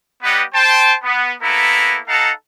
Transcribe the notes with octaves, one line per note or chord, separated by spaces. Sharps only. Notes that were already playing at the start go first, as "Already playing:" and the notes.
G3 B3 G4 B4 D#5 F#5
C5 G5 A5
B3
A#3 B3 E4 A4 B4 A#5
D#4 A4 F5 F#5 A5 A#5